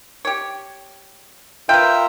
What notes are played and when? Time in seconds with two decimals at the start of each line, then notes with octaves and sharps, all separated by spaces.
0.25 G4 C#5
1.69 F4 A#4 B4 E5 G5